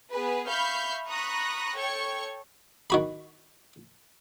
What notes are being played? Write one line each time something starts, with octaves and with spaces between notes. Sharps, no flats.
B3 G#4 B4
E5 F5 B5 C#6 F6 G6
A#5 B5 C#6 D#6 F#6 A#6
A4 C#5 G5 C#6 G#6 C#7
D#3 F#4 B5